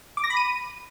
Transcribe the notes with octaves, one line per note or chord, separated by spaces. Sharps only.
D6
A#6
B5
D#7